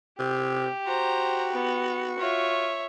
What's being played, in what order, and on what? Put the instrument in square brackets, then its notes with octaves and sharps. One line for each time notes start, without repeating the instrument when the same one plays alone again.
[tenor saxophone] C3 [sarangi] G4
[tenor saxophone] F#4 [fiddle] C5 A#5
[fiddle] B3
[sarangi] F4 [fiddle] C#5 E5